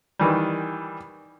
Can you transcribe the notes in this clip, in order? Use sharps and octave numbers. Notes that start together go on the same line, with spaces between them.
D#3 E3 G3